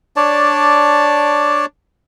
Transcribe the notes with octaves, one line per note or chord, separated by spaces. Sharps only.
D4 C#5 D5 A5